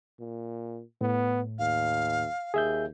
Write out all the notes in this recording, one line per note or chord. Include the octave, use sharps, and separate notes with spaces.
A#2
A2 B3
D#2 F5
D#2 G#4 E5 G6